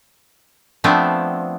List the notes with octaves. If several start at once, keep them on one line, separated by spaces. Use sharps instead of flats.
F3 A3 B3 C4 D4